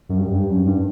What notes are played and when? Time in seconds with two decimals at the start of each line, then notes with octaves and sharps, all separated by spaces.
0.09 F#2
0.18 G2
0.33 G2
0.50 F#2
0.65 G2